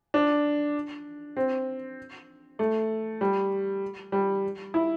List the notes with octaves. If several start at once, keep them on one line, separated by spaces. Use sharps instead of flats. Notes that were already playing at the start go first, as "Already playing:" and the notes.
D4
C4
A3
G3
G3
E4